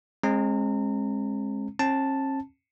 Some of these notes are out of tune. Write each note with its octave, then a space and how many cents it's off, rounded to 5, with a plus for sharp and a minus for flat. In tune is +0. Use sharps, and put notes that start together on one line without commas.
G#3 +0 C4 +45 A#5 -35
C#4 -45 A5 +0